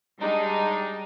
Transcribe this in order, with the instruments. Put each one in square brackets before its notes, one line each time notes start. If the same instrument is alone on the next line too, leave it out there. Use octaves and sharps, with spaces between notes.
[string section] G3 G#3 D4 D#4